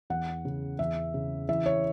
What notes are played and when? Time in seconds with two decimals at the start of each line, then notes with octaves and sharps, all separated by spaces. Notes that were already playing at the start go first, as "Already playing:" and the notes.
0.10 E2 F#5
0.45 C#3
0.79 E2 E5
1.14 C#3
1.49 E3 E5
1.66 C#5